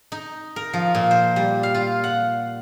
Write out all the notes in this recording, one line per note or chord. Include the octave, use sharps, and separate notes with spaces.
D#4
A#4
F3
A#2
C5
G3
F5
F4
F#5